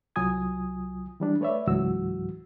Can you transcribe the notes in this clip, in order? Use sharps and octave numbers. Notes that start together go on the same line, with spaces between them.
C2 F#3 F4 G#5 D#6 G#6
E3 G3 D4
A3 B4 C#5 D5 E5
C#2 G#2 E3 F#3 F#4 E6